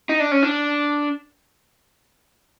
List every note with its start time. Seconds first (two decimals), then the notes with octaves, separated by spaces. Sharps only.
0.09 D#4
0.20 D4
0.32 C#4
0.43 D4